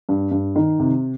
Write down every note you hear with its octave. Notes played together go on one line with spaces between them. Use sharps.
G2
G2
D#3
C3